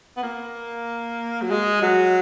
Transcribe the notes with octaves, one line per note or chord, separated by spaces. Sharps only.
B3
A#3
F#3
G#3
F#3